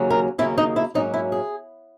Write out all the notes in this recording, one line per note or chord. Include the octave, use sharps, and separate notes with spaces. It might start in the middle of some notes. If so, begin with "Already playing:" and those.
Already playing: D#2 C#3 F#3 A#3 C#4
A#4
D#2 C#3 F#3 A#3 C#4 E4
D#4
E4
G#2 F#3 A#3 C#4 D#4
E4
G#4